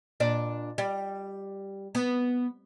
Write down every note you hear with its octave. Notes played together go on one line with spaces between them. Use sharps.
A#2 D4 D5
G3
B3